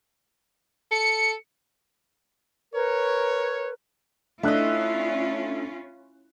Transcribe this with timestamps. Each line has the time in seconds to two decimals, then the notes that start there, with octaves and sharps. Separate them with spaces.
0.91 A4 C#7
2.74 A#4 B4 C#5
4.43 A3 C#4 D4 E4 F4 D#5 E5 F#6